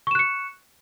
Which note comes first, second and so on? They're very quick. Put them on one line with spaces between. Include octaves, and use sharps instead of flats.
C#6 E7 F#6 C#7